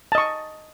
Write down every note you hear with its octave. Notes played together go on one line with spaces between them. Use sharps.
D#5 A5 C#6